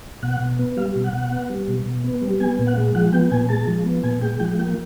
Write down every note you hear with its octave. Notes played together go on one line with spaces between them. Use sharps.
B2 F#5
B2
B3
G3 F5
B2
F#5
B2
B3
G3
B2
B2
B3
G3
B3 G#5
A#2
F#5
G#3
F3 F#5
B3 G5
A#2 G#5
G#3 A5
F3
B3
A#2 G#5
G#3 G5
F3 G5
A#3 G5